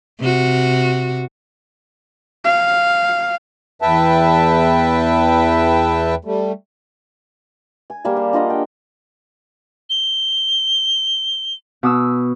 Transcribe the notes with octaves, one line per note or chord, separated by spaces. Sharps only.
C3 F#4
F5
E2 B4 E5 G5 A5
G3 A3
G#5
G3 A#3 G#4 A5
F5
D4 F4 D#5 F#5
G5
G7
B2 D#6 E6